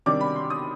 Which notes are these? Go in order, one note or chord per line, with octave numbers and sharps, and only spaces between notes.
C3 D#3 G3 D4 D6
B5
C6
D#6